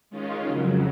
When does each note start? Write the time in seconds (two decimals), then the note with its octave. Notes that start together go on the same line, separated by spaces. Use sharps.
0.10 D#3 G#3 C#4 F4
0.46 F2 C#3 F#3